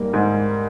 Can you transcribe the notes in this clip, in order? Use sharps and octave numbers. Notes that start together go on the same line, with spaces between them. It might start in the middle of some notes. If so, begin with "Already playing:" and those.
Already playing: G#2 G3 A#3
G#2